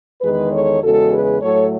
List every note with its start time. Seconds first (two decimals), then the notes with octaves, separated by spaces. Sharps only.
0.21 E2 D#3 G#3 G#4 B4
0.51 A4 C#5
0.81 E2 C#3 G#3 F#4 A4
1.11 G#4 B4
1.41 A2 F#3 A3 A4 C#5